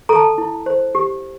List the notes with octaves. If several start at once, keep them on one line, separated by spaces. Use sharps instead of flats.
A4 A#5
A5
E4
C5
G4